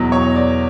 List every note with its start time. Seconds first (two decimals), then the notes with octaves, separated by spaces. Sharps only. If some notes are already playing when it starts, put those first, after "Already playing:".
Already playing: E2 B2 F#3
0.12 C#5
0.36 D5